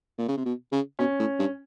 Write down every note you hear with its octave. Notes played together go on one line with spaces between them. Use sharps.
A#2
C#3
C3
B2
C#3
B2 C#4
A2
G2